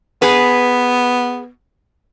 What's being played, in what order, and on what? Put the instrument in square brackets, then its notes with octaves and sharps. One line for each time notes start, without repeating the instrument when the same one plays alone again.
[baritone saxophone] B3 [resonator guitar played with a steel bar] G#4 B4